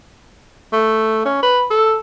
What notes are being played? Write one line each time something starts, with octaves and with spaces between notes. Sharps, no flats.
A3
C#4
B4
A4